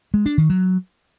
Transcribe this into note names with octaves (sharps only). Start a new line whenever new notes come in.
G#3
D4
D#3
F#3